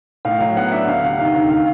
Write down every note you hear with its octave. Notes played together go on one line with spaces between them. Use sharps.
A2 F5
F#3
B3 F#5
D4 E5
D2 F5
C3 F#5
D#3 F5
D2
F5